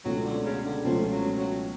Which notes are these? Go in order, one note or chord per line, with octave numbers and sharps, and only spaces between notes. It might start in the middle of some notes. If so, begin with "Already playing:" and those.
C#2 B2 F#3 A3 C#4 F4
D3
C#3
D3
C#2 B2 F3 A3 C#4 F4
F#3
F#3